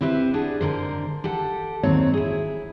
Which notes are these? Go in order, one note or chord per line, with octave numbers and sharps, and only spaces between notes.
C4 E4 G4 B4 C5
D4 G#4 F#5
G#2 D3 A#4 C5
G4 A4 F#5
D#2 G#2 F#3 C4 C#5
E4 G#4